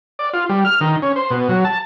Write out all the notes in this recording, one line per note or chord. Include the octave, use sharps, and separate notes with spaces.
D5
F4
G3
F6
D#3
C#4
C5
B2
F#3
A5